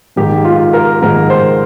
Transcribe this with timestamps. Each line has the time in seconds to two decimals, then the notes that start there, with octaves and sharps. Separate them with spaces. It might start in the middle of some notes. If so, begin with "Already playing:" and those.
0.16 G#2 D#3 A#3 G4
0.45 F4
0.73 A#4
1.02 G#2 D#3 A#3 A#4
1.30 C5